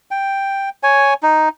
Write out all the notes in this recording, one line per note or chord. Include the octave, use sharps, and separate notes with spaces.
G5
C#5 G#5
D#4